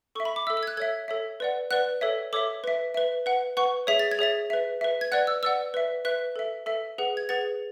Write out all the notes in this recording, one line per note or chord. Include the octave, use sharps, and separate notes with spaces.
A4 E5 C#6
B5
D6
A4 E5 E6
E6
G#6
F#6
A4 C#5 E5 G#6
A4 C#5 E5
B4 D5 F#5
B4 D5 F#5 F#6
A4 C#5 E5
A4 C#5 E5 D6
B4 E5
B4 E5
B4 F#5
B4 F#5 C#6
G#4 C#5 E5 B6
A6
G#6
G#4 C#5 E5 A6
B4 E5
B4 E5
G#6
B4 D5 F#5 F#6
E6
B4 D5 F#5 E6
B4 E5
B4 E5 F#6
A4 E5
A4 E5
G#4 B4 F#5
G#6
G#4 B4 F#5 A6